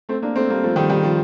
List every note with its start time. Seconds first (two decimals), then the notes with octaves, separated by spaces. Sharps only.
0.09 A3 C4
0.22 A#3 D4
0.35 A3 C4
0.49 G3 A#3
0.63 F3 A3
0.76 D#3 G3
0.89 D#3 G3
1.03 F3